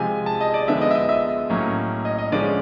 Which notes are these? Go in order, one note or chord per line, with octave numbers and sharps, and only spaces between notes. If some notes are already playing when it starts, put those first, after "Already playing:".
Already playing: C3 F3 G#3 G#5
A5
D#5
D5
D3 F3 G#3 B3 E5
D#5
E5
D#5
E5
A2 F#3 A#3 C#4
D#5
D#5
D3 F3 G#3 C#4 D5